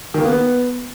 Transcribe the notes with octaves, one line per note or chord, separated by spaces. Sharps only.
D#3
A#3
B3